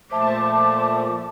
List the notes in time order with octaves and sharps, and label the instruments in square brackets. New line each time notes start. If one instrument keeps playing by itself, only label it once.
[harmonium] A#2 F3 A3 [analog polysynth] C5 E5 A5 [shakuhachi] D6